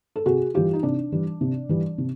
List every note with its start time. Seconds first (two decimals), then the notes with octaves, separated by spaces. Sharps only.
0.16 A4
0.26 C3 F#4 G#4
0.54 E3 G3 F4 G4
0.73 D#4
0.83 C3 D4
1.12 E3 G3
1.41 C3
1.69 E3 G3
1.98 C3